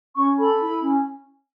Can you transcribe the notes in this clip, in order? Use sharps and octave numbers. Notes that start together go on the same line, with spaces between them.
C#4 C#6
A4 B5
E4
C#4